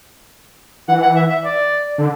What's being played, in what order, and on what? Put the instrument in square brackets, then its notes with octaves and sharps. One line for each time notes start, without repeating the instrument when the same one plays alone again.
[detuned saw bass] E3 [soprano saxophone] F#5
[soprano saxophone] F#5
E5
E5
D5
[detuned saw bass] D3